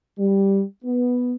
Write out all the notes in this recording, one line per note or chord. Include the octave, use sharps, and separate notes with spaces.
G3
B3